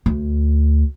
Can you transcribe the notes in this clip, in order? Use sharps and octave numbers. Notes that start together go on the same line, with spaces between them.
D2